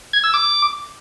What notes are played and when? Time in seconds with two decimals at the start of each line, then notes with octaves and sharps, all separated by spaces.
0.13 G#6
0.24 E6
0.34 D6